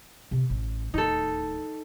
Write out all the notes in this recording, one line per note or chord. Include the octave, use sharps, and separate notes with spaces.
C3
A1 D#4
D1 D#2 D#4 A4